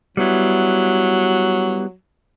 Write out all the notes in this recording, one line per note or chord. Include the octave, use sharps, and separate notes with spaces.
F#3 G3 B3 E4